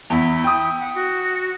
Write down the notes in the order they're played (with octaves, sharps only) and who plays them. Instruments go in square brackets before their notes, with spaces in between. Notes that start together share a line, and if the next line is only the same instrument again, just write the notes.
[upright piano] E2 [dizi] E4
[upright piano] G5 D#6
[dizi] F#5
F#4